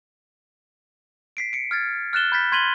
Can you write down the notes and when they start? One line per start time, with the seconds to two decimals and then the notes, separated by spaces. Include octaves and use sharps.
1.37 B6 C7 D7
1.53 C#7 D7
1.71 F6 G#6 A6
2.13 F6 F#6 A6 E7 G7
2.32 B5 G6 A6 B6
2.52 C6 G#6 B6 D#7 F#7 G7